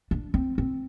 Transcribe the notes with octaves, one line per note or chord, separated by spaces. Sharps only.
D4
C4
C4